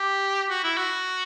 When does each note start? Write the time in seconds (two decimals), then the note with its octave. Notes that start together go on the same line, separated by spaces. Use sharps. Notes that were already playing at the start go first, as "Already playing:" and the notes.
Already playing: G4
0.50 F#4
0.64 E4
0.78 F#4